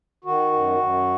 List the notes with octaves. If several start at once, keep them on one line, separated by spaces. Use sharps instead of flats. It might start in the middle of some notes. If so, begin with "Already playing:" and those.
D#3 F#4
F#2
F#2